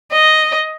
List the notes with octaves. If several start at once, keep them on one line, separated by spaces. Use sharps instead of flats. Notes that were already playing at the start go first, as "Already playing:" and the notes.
D#5